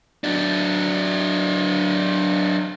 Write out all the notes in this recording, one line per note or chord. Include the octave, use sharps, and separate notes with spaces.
F#3 D4